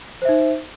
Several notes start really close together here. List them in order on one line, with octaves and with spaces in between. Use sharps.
C5 E5 D#4